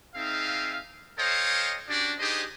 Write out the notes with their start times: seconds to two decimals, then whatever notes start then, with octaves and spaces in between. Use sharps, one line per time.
0.15 C4 D#4 G#4 E5 F5
1.18 A4 C5 C#5 D#5 F5 G5
1.89 C#4 D4 F#4 G4 D5
2.19 D4 D#4 G4 G#4 C5 D#5